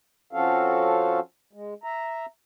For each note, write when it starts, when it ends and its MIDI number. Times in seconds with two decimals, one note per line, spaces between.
0.33 1.20 53
0.33 1.20 60
0.33 1.20 61
0.33 1.20 66
0.33 1.20 69
0.33 1.20 77
1.53 1.74 56
1.84 2.26 76
1.84 2.26 82